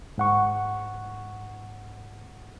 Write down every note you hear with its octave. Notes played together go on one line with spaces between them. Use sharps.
G#2 F#5 C#6